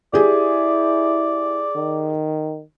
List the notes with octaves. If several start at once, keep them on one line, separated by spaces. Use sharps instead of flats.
E4 G4 G#4 D5
D#3